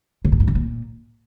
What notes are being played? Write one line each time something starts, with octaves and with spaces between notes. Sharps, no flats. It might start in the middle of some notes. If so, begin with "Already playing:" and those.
C#3
A#2
G2
C#3
A#2